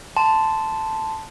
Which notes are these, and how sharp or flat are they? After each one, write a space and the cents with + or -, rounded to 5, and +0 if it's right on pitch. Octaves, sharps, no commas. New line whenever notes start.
A5 +0 C6 -15